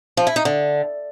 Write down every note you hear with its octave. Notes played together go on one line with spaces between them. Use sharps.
F3
E4
D#4
D3